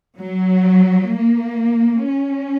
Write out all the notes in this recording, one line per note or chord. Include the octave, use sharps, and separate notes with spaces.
F#3
A#3
C#4